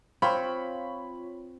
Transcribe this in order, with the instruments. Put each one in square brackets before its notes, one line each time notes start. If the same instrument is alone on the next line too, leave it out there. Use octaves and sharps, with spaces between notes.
[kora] C4 [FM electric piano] F4 C#5 [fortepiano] B5